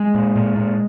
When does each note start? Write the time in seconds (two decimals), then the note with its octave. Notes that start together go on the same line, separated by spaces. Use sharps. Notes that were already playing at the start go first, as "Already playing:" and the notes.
Already playing: G#3
0.15 A#2
0.36 A#2
0.56 A#2